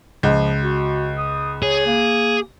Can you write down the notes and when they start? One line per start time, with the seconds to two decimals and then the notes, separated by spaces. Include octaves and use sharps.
0.23 C#2 F3
0.63 F#4
1.18 D#6
1.63 G#4 C#5
1.86 A#3